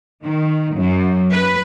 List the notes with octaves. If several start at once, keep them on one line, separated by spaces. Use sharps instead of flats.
D#3
F#2
B4